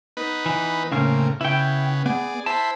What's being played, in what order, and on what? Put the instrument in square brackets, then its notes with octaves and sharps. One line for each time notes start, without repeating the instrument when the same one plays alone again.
[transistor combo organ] B3 D#4 B4
[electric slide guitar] E3
[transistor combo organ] A2 A#3 [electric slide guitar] C#3 C4 C#4
[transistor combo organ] C#3 B3 [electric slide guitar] E4 G5
[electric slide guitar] B3 [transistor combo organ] G#4 D5
[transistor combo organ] E4 C5 B5 [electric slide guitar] A5